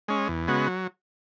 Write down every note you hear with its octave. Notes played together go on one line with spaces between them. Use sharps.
G#3 C#4
E2
C#3 G#3 B3 F#4
F#3